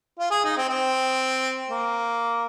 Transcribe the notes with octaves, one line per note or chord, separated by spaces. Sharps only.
F4
G#4
D#4
C4
C4
A#3